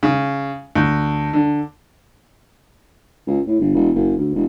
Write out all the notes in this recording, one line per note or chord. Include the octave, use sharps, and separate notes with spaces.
C#3
D2
D3
C#2
A2
G1
E1
F#1
D2
E1